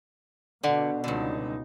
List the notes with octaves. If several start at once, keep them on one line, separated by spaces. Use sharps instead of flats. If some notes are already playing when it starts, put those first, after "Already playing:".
B2 D3 A4 D5 F#5
C#2 G2 D3 D#4